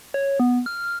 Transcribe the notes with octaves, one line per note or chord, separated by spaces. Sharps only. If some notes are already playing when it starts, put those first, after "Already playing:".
C#5
B3
F6